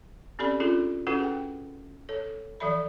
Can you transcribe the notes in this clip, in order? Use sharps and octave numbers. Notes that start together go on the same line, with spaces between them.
C4 C#4 G4 A4 D5 B5
C#4 D4 F4 G#4 A4
C#4 E4 F#4 A4 B4 F#5
G#4 G5
A4 C#5
E3 F3 A4 D5 E5 B5